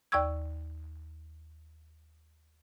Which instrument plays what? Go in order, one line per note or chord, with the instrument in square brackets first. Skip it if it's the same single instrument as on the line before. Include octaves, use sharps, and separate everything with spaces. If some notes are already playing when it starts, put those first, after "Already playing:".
[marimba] D#2 D5 G5 C#6 E6 G#6